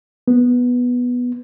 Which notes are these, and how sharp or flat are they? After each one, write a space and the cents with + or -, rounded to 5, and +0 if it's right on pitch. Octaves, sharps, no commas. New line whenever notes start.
B3 -5